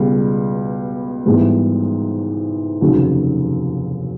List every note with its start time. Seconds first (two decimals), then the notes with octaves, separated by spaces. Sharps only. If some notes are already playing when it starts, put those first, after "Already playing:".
Already playing: C#2 B2 G3
1.26 G#1 G#2 E3 G3 B3
2.81 F1 D#2 C#3 F#3